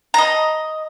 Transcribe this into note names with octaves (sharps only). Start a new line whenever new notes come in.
D#5 A#5